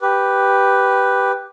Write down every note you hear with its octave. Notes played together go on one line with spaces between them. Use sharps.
G4 B4